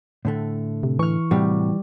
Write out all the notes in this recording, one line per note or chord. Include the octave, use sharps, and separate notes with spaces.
A2 D3 A3
C3
E3 C#6 F6
A2 C3 G3 F#4